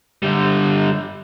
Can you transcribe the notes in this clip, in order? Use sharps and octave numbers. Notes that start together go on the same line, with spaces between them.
D3 G3